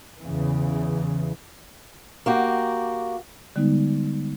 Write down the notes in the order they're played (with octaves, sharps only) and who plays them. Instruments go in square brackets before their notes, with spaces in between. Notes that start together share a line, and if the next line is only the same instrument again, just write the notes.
[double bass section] E2 C#3 E3
[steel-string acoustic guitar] A#3 F#4 G4
[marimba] D3 G3 G#3 B3 D#4